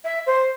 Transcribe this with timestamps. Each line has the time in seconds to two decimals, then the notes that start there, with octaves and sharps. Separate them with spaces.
0.04 E5
0.26 C5